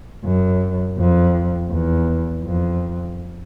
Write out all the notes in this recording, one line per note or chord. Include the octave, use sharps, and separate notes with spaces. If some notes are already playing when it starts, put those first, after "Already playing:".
F#2
F2
E2
F2